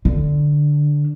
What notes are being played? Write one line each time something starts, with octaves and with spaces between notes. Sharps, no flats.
D3